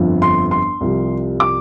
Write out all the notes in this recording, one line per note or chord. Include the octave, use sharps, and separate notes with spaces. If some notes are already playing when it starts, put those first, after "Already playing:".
Already playing: G1 F2 F3
C6
C6
C2 C3 F3
D6